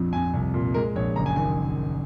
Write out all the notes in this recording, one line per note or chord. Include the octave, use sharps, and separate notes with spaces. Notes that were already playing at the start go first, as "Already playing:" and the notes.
Already playing: A#1 F2 F3
F2 G#5
C2
A#2
G#3 A#4
A#1 C#5
F#1 A#5
G#5
D#3 G#5